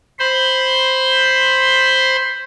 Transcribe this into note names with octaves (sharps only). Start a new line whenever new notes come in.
C5 B5 C6